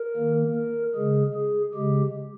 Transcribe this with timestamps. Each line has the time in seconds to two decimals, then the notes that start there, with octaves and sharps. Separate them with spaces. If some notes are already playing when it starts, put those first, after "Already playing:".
Already playing: A#4
0.16 D#3 A#3
0.56 A#4
0.95 C#3 G#3 G#4
1.35 G#4
1.74 C#3 G#3 G4